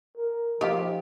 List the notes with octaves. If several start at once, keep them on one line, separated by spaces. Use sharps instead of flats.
A#4
F3 D#4 F4 G4 F5